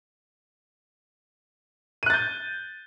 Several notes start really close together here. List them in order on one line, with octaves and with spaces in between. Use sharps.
D#7 F#6 A6 G6